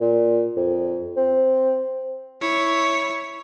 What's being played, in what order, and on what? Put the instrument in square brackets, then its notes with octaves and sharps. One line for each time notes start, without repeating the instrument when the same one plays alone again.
[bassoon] A#2
F2
C4
[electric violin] E4 C#5